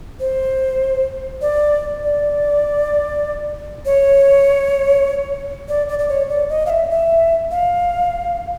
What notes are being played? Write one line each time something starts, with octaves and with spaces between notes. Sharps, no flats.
C5
D5
D5
C#5
D5
D5
D5
C#5
D5
D#5
F5
E5
E5
F5